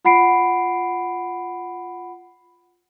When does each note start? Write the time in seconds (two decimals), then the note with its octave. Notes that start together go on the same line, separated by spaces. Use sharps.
0.05 F4 F#5 B5 C7 D7